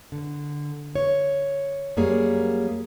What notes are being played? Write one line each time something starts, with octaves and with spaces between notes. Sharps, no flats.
D3
C#5
F#2 G3 A#3 G#4 C#5